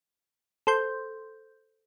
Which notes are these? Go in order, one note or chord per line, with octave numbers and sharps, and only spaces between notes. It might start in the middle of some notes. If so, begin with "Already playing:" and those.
A4 C5 C6 G6